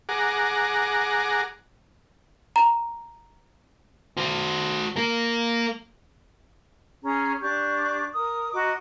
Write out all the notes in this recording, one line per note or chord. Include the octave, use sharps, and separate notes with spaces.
G#4 F#5 A#5 D6
A#5
F#4 C5
A#3 A#4
C#4 G#4 A#5
D4 G4 C#6 D6
A#4 D#6
F#4 D#5 A#5 D6